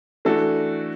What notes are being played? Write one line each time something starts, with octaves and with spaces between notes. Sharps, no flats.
E3 A3 D4 F#4 A4